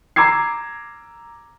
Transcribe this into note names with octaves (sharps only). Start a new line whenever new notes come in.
A#5 D6 E6 G#6 C7